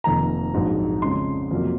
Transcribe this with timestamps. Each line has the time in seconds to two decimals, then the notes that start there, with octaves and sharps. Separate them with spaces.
0.04 F1 F2 D#3 A#3 A#5
0.54 A#1 G#2 F#3
1.02 F2 C#3 G#3 C6
1.51 F2 C3 F#3 A#3